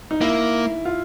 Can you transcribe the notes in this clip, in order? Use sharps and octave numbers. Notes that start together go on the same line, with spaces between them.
D#4
A#3 E4
F4